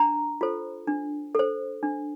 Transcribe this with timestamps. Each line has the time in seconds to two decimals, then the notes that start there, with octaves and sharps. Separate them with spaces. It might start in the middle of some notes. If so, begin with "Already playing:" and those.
Already playing: D4 A#5
0.41 F4 A4 C5
0.87 D4
1.35 A4 C5
1.83 D4